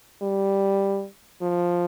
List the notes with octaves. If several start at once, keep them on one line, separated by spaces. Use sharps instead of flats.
G3
F3